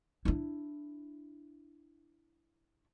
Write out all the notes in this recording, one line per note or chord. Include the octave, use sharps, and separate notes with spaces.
D4 E4